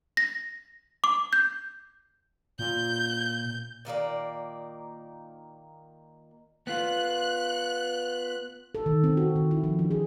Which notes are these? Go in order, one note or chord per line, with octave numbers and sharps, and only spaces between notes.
A#6
D6
G6
A#2 G6
A#2 D#3 A#3 D5
B3 F4 F#6
A4
D#3
C4
F#4
D#3
E4
F3
D4
G#4